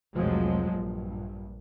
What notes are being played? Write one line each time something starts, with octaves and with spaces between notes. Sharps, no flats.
F1 C2 F3 F#3 G#3
A#1 G2